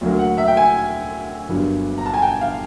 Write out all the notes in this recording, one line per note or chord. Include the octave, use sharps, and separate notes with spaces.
D2 D3 F#3 A#3
F#5
E5
G5
G#5
G1 G2 D3 F#3 A#3
A#5
A5
G#5
G5
F5